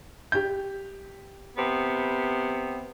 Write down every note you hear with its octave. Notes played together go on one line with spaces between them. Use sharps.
G4 G6
C3 B3